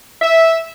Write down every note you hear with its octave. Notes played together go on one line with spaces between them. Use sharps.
E5